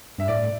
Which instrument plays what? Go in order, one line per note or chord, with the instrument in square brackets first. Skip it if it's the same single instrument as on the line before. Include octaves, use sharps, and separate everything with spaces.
[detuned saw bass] G2 [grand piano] E5
[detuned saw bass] A2 [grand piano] D5